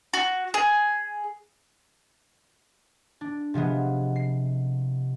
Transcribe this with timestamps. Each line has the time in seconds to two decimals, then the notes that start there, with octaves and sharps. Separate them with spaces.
0.13 F#4
0.54 G#4
3.21 D4
3.54 C3 F3 G#3 B3
4.16 C7